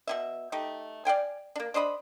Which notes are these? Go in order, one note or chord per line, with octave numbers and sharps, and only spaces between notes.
B2 C#4 E5
A3 D#4 G4
D5 F5 G5 G#5
A#3 D4
D4 C5 D#5 B5